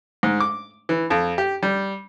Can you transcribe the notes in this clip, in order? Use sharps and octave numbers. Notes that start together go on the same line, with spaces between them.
G#2
D6
E3
F2
G4
G3